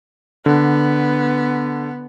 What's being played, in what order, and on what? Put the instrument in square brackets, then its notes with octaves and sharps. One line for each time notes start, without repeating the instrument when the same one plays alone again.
[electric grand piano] D3 [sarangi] B3